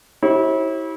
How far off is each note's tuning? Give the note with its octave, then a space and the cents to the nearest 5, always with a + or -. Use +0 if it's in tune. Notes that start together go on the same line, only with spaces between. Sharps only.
E4 -30 G4 -40 C#5 -45